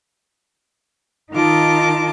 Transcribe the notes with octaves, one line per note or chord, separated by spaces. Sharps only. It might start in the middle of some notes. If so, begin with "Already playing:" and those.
D#3 D#4 F4 A5 D6